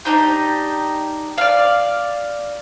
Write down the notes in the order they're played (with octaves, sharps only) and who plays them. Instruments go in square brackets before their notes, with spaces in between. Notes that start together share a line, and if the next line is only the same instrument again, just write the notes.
[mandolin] D4 D#4 G4
D5 F5